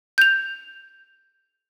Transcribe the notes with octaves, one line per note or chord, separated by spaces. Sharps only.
G6 F7